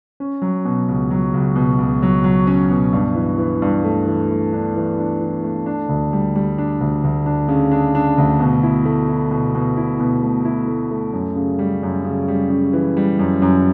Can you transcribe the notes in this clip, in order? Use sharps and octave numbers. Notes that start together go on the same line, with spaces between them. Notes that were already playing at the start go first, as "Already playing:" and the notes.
C#4
F#3
B2
C#2
F#3
C#2
B2
C#2
F#3
F#3
C#4
B2
G2
E3
E3
G2
A3
E3
A3
D4
E3
D4
E3
A3
D4
D2
G3
G3
D4
D2
D2
D4
C#3
D4
D4
D2
B2
E4
A3
E4
B2
B2
E4
B2
A3
E4
A3
A3
F#2
C#3
G3
F#2
C#3
G3
C#3
E3
G3
F#2
F#2